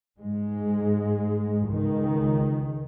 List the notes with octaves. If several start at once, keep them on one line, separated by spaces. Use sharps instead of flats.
G#2 G#3
C#2 D#3